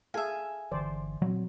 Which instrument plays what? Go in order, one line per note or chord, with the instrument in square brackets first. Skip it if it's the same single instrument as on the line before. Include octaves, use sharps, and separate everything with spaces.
[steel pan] G#4 A4 F5 [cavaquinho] E5 G#5
[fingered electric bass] G1 D3 E3 [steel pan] C5 D5
[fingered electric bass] A#2 C4 [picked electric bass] F#3